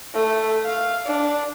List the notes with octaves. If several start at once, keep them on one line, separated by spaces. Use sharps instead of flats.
A3
F5
D4